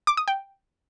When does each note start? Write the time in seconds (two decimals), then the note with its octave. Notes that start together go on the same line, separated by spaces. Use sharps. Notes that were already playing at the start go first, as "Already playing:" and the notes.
0.07 D6
0.17 D#6
0.28 G5